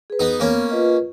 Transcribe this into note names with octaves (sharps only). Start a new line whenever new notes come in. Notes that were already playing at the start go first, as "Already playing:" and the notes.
G#4 B4
B3 D#4
A#3 B3 C#4
F4 B4 D#5